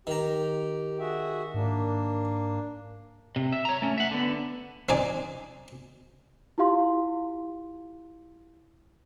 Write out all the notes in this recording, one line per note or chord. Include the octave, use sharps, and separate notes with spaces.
D#3 G4 A#5
F#4 G#4 E5
G#2 A#3 D4
C3
E5
C#5 A#5
A3 C#4
E5 F#5
D3 B3
C4 D#4 D5 G#5
E4 F4 G4 F5 C6